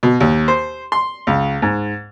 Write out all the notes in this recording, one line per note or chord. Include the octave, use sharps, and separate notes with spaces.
B2
D#2
C5
C6
C#2
G#2